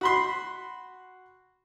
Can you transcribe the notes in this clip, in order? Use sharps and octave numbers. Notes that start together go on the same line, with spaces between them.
F#4 B5 C6